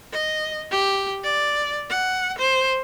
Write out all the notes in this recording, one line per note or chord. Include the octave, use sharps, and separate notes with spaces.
D#5
G4
D5
F#5
C5